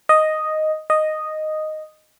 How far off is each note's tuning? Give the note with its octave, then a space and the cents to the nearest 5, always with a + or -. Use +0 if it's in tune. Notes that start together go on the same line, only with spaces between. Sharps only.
D#5 +0
D#5 -5